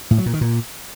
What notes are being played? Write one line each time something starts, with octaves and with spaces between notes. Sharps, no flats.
A2
F#3
A#2
D#3
A#2